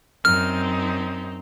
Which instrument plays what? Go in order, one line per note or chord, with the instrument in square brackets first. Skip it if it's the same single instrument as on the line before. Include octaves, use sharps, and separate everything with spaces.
[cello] F#2 [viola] C4 D#4 [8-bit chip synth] F6